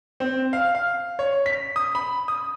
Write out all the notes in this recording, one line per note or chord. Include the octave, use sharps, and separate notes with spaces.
C4
F5
F5
C#5
B6
D#6
B5
D#6